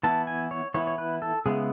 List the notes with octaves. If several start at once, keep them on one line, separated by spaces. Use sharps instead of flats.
E3 B3 E4 A5
G#5
C#5
E3 B3 E4 C#5
C#5
B4
A4
C#3 G#3 B3 E4 G#4